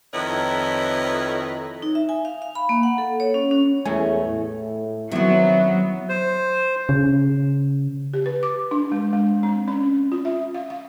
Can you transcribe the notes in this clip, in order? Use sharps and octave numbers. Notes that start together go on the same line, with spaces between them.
F2 D#3 E4 B4 C#5 D#5
D#4
E5
G#5
F5
F5
B5
A#3
F#5
A4
C#5
C#4
C#4
E2 A3 A4 C#5 G#5
A2
F#2 D#3 F#3 B3 C4 E4 E5
C5
C#3
G4
B4
D6
D4
G#3
G#3
C4
C#4
F4
E5
F5
F5